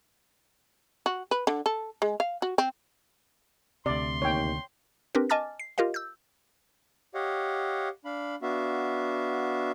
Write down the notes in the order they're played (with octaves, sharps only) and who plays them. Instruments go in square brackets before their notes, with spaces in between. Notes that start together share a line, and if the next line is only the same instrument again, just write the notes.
[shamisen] F#4
B4
D3
A4
G#3
F5
F#4
C4
[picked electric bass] D2 C3 [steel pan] D5 [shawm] C6
[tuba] D#2 [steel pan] C#5 G5
[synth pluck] C4 D4 G4 A#4 B4
D#5 G#5 A5 D6 F6 A6
C7
F4 G4 A#4 D#5 F5
E6 G6
[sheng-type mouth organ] G4 C#5 D#5 F5 F#5
D4 F5 B5
B3 D4 F#4 E5 F5